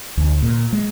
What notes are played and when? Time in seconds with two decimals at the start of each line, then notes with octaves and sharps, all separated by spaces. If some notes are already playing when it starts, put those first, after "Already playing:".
0.17 D2
0.42 A#2
0.73 G#3